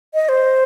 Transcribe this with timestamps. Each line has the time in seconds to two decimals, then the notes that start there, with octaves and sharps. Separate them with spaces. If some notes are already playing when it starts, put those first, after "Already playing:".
0.14 D#5
0.29 C5